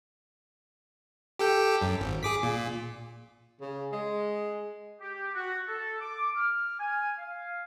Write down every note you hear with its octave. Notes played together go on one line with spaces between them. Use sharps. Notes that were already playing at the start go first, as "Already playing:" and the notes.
G4 A4 G5
F#2
G#1
G#4 D6 B6
A#2
C#3
G#3
G4
F#4
A4
D6
F6
G#5
F5